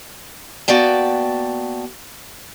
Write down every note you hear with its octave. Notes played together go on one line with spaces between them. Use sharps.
A#3 B3 F#4 D5 G5 A5